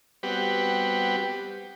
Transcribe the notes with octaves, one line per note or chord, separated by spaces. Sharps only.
G3 B3 C4 F#4 G4 B4